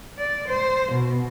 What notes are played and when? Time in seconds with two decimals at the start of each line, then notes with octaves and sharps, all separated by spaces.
0.17 D5
0.48 C5
0.92 B2